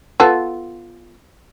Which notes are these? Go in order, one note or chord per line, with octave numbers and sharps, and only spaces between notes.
B3 F4 A4